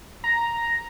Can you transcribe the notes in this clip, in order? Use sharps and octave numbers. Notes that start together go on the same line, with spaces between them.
A#5